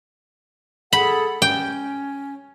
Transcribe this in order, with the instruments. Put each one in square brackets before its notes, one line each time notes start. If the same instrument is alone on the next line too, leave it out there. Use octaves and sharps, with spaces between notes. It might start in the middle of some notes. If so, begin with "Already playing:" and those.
[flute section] G#4 A4 F#5 [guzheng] B5
[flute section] C#4 [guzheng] G5